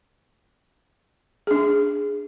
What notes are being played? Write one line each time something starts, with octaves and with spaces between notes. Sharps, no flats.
D4 G#4